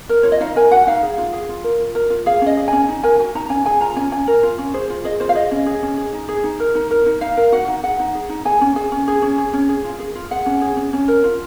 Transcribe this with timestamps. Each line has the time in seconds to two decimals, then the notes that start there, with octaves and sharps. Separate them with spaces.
0.09 A#4
0.23 F4 C#5
0.32 D#5
0.40 D#4 F5
0.56 A#4 G#5
0.72 F#4 F#5
0.87 D#4 F5
1.02 G#4
1.18 F4
1.33 G#4
1.49 F4
1.64 A#4
1.80 F4
1.95 A#4
2.10 F4
2.26 G#4 F5
2.42 C#4 D#5
2.57 G#4
2.68 C#4 G#5
2.89 D#4
3.03 A#4 G#5
3.20 F#4 G#5
3.35 D#4 A#5
3.50 C#4 G#5
3.66 G#4 G#5
3.81 F4 A#5
3.96 C#4 G#5
4.12 C#4 G#5
4.27 A#4
4.43 F4
4.58 C#4
4.74 G#4 C5
4.90 F4
5.04 G#4 D#5
5.20 F4 C5
5.29 F5
5.35 G#4 D#5
5.51 C#4
5.66 G#4
5.83 C#4
5.97 G#4
6.13 D#4
6.29 G#4
6.44 D#4
6.60 A#4
6.75 D#4
6.91 A#4
7.06 D#4
7.21 D#4 F5
7.37 A#4
7.52 F#4 F#5
7.68 D#4
7.83 G#4 F#5
7.99 D#4
8.15 G#4
8.29 D#4
8.45 G#4 G#5
8.61 C#4
8.76 G#4 G#5
8.92 C#4
9.08 G#4
9.22 C#4
9.38 G#4
9.53 C#4
9.69 G#4
9.85 F4
9.99 G#4
10.15 F4
10.31 G#4 F#5
10.46 C#4
10.61 G#4
10.77 C#4
10.93 C#4
11.08 A#4
11.24 F4